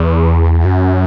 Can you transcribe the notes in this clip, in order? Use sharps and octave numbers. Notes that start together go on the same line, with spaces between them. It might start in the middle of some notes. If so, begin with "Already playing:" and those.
Already playing: E2
F#2